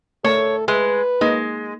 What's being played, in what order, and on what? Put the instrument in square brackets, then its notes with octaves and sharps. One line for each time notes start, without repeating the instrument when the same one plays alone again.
[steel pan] A3 A#4 A5 [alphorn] A4 [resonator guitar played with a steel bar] C#5
[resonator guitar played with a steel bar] G#3 [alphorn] B4 [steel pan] E5
[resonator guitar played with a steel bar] G#3 [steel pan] A#3 D#4 D#5